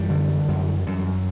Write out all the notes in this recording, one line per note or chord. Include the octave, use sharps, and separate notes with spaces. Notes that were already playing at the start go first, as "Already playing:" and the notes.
Already playing: F#2 E3 G3
D3
F#2
F#2